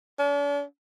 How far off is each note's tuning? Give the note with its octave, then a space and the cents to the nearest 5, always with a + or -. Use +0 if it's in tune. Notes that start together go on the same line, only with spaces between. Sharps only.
D4 -45